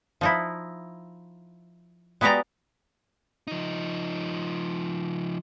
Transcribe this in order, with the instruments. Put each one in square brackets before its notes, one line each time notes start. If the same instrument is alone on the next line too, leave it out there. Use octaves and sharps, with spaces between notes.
[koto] F3 D#4 E4
G#3 B3 F#4 G4 D5 A#5
[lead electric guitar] F3 D#4